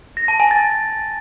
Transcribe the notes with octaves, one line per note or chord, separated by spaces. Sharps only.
A#6
A5
G#5
A6